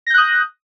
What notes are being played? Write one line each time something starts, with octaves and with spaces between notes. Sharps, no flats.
D#6 F#6 G6 A#6